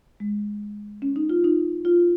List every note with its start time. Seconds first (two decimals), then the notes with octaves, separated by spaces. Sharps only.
0.20 G#3
1.02 C#4
1.16 D#4
1.30 F4
1.44 D#4
1.85 F4